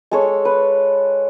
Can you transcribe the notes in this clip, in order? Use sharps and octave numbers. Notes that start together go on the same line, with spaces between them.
G#3 A4 C#5
B4